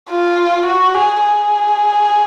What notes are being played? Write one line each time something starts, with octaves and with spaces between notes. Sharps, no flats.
F4
F#4
G#4
G#4